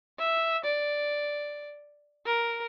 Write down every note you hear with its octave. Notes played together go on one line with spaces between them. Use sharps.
E5
D5
A#4